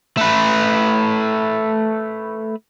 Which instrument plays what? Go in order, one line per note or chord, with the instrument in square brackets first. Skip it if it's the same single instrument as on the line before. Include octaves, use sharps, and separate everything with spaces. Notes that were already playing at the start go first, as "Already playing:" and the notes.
[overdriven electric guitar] A3 B4